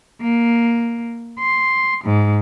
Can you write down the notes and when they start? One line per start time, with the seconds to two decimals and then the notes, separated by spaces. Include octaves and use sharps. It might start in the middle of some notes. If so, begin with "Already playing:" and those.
0.21 A#3
1.39 C6
2.04 G#2